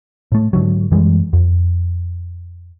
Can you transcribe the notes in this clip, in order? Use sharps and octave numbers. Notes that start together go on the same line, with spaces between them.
A2 A3
G#2 D3 F#3
F#2 E3 G3 G#3
F2